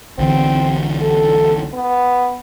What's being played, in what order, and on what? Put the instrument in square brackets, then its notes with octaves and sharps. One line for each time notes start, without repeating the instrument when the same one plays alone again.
[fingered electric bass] B1 D3 E3 [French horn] C4
[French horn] A4
B3